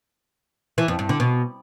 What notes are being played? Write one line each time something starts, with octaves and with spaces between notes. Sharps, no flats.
E3
F2
G2
D3
B2